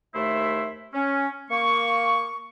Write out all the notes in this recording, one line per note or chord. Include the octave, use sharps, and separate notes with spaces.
D#2 A3 E4 C5 E5
C#4
A#3 C#6